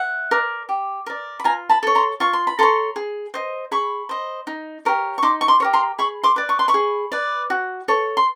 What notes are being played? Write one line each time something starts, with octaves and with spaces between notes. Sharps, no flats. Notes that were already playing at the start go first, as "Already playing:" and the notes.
Already playing: E5 F#5
A#4 D5
G4
A#4 D5
B5
F4 G#5 A#5
A5 B5
A4 C#5
A#5 C6
F4 C#6
C6
B5
A4 C#5 A#5 C6
G#4
C5 D#5
G#4 B5 C#6
C5 D#5
D#4
G4 A#4 C#5
C#6
D#4 C6 D6
C#6
C6 D6
G4 A#4 C#5
A#5 C6
G#4 B5 C#6
C6 D6
B4 D5
C#6
C6
B5 C#6
G#4
B4 D5
F#4
A4 C#5
C6